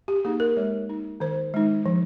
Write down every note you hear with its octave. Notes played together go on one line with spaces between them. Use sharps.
G4
A#3 D#4 G#4
A#4
G#3 C#5
D#4
D#3 C5
G#3 D#4
F3